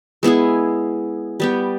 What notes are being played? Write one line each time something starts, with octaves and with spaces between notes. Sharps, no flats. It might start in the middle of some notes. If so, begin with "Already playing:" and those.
G#3 B3 E4 G#4
G3 B3 G4